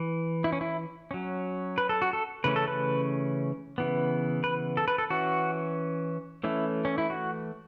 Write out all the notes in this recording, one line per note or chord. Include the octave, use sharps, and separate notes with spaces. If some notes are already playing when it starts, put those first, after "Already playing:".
Already playing: E3
E4
C#4
E4
F#3 C#4
B4
A4
F#4
A4
C#3 E3 A3 C#4 B4
A4
B4
C#3 E3 B3
B4
A4
B4
A4
E3 C#4 F#4
E3 A3 C#4 E4
C#4
E4
F#4